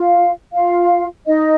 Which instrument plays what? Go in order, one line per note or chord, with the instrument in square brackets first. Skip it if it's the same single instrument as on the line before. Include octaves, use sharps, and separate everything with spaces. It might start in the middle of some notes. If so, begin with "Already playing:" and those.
Already playing: [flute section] F4 F5
F4 F5
D#4 D#5